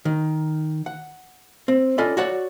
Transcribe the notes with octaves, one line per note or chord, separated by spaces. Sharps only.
D#3
F#5
C4
C#4 F4 A4 D5 D#5 B5
F#4 C#5 D5 F#5